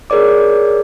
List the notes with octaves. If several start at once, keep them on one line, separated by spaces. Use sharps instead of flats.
G#4 A#4 C#5 D5 D6